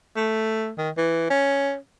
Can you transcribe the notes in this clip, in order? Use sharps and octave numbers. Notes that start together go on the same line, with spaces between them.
A3
D#3
E3
C#4